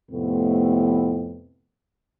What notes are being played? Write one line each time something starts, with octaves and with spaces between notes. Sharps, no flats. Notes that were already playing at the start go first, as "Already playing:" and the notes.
F2 A2 C3 A3 B3 C4